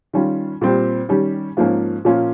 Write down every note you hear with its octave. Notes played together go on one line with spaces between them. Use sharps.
D#3 G3 C#4 F4
A#2 G3 C4 G4
D#3 G3 C#4 G4
G#2 F3 A#3 C#4
A#2 F3 A#3 C#4 F4